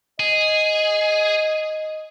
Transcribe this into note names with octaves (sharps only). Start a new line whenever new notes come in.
G#4 D#5